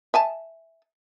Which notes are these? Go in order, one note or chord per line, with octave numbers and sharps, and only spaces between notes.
E5 G#5 A5